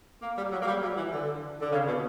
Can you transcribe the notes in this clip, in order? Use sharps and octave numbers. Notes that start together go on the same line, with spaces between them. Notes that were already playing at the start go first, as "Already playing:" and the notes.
A#3
G3
F#3
A#3
G3
F#3
E3
D3
D3
C#3
B2